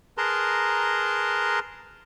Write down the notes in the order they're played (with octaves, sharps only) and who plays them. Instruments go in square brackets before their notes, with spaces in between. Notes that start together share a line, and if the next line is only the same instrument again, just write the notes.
[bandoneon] G#4 A#4 B4 A5 A#5 C6